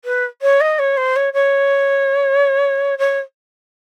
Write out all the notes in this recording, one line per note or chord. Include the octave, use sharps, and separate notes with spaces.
B4
C#5
D#5
C#5
C5
C#5
C#5
C#5